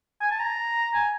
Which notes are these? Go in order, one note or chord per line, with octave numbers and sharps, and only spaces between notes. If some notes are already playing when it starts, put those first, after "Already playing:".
G#5
A5
A#5
G#5